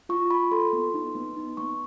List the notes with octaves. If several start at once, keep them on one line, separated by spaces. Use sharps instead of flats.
F4 C#6
F4 B5
A4 C6
B3
D#4
B3
D#4
B3 C#6